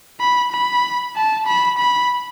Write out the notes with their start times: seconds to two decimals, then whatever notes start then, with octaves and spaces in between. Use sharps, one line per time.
0.20 B5
0.52 B5
1.16 A5
1.47 B5
1.78 B5